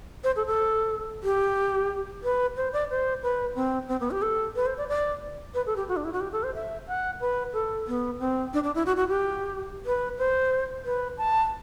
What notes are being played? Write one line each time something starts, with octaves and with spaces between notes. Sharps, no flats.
C5
A4
A4
G4
B4
C5
D5
C5
B4
C4
C4
B3
G4
A4
B4
C5
D5
D5
B4
A4
G4
F#4
D4
E4
F#4
G4
A4
C5
E5
F#5
B4
A4
B3
C4
D4
D4
E4
F#4
F#4
G4
B4
C5
B4
A5